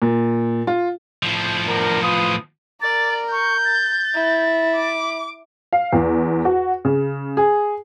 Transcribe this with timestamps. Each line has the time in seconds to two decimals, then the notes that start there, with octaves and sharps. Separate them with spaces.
0.02 A#2
0.67 F4
1.23 A2 F3
1.67 B3 D4 A#4
2.02 F4 B4 D#6
2.82 A#4 D5 A6
3.32 C#6 G6
3.65 A6
4.15 E4
4.77 D6
5.73 F5
5.93 E2
6.45 F#4
6.85 C#3
7.37 G#4